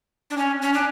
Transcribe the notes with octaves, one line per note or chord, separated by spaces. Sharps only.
D4
C#4
C#4
D4